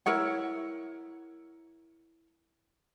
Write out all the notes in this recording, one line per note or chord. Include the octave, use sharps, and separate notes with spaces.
E4 A#4 C#5 F#5